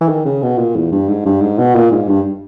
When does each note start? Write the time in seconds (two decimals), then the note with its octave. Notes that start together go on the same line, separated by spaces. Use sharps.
0.01 E3
0.09 D#3
0.25 C#3
0.42 B2
0.58 A#2
0.76 E2
0.92 G2
1.09 G#2
1.26 G2
1.41 G#2
1.58 B2
1.75 A#2
1.92 G#2
2.08 G2